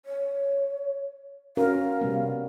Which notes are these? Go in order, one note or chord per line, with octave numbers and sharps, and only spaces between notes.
C#5
C#4 F#4 A#4 F5
C3 G3 B3